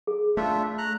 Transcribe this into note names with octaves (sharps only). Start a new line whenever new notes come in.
G#4
A3 D4 F4 E5
A#5 F#6